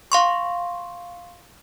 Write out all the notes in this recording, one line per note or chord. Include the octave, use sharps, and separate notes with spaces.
F5 C6 C#6